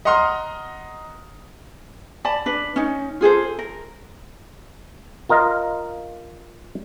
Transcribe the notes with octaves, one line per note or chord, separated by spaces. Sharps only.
D#5 F#5 A#5 C6 D#6 F6
D5 A5 B5
D4 B4
C#4 D#4
F4 G#4 A4 C5
A#4
F4 A#4 D#5 F5